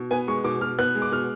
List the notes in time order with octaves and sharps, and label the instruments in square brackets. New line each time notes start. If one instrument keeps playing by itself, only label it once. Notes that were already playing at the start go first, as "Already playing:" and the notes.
Already playing: [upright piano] B2
B3 G#5
G#3 C#6
B2 D6
B2 F6
B3 F#6
G#3
D6
B2 F6